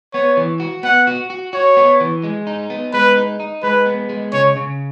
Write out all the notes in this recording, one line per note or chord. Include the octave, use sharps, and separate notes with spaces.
B3 C#5
E3
F#4
B3 F#5
F#4
F#4
F#4 C#5
B3
E3
G#3
D#4
B3
G#3 B4
D#4
D#4
G#3 B4
B3
G#3
C#3 C#5
C#3